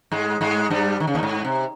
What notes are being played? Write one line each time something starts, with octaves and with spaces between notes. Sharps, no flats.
G#2 G#3
G#2 G#3
G2 G3
D#3
C#3
D#2 D#3
G#2
C3